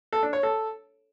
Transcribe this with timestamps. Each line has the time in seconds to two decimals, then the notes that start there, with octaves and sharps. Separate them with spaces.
0.13 A4
0.23 D4
0.33 C#5
0.43 A4